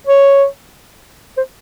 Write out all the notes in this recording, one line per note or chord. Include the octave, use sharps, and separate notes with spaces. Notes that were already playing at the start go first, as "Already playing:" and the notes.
C#5
C5